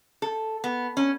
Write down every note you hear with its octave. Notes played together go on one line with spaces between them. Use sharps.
A4
B3
C#4